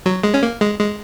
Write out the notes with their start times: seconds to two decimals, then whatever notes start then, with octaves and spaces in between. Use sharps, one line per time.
0.06 F#3
0.23 G#3
0.34 C#4
0.43 A#3
0.61 G#3
0.79 G#3